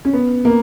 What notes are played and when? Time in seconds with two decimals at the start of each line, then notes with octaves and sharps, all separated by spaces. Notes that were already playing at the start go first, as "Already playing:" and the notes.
0.05 C#4
0.13 B3
0.45 A#3